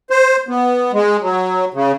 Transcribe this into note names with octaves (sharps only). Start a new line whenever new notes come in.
C5
B3
G#3
F#3
C#3